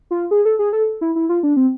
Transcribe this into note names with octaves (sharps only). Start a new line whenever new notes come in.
F4
G#4
A4
G#4
A4
E4
E4
F4
D4
C4